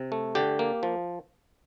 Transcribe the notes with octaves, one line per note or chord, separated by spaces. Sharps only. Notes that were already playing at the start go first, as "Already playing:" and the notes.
Already playing: C3
A3
D3 G4
A#3
F3